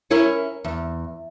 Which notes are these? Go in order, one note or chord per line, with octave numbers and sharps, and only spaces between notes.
C#4 E4 A#4
E2